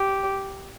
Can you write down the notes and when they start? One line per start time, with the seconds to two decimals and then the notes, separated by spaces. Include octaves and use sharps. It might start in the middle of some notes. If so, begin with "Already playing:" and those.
Already playing: G4